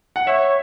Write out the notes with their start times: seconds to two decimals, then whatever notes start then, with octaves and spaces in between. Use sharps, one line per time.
0.16 F#5
0.27 C#5 E5